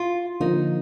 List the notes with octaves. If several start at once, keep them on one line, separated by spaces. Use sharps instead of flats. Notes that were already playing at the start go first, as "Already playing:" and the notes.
Already playing: F4
D3 F3 A#3 D#4